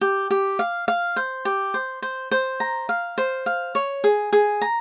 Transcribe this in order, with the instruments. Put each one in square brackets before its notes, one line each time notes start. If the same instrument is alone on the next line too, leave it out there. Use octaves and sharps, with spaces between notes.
[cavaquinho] G4
G4
F5
F5
C5
G4
C5
C5
C5
A#5
F5
C5
F5
C#5
G#4
G#4
A#5